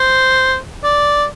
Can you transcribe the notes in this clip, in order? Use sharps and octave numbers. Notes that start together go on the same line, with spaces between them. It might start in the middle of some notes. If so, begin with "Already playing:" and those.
Already playing: C5
D5